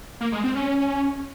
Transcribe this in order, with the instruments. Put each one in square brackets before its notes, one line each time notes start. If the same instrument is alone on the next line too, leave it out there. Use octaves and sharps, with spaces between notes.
[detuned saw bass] A#3
G#3
C4
C#4